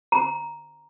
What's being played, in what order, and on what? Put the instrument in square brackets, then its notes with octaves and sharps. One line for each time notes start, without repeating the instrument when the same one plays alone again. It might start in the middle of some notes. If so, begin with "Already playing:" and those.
[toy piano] A#5